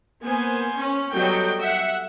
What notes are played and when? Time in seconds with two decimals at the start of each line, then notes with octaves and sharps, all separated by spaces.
0.23 A#3 B3 C5 G#5
0.78 C#4
1.12 F#3 G3 B3 A4 D#5 G5
1.60 E5 F#5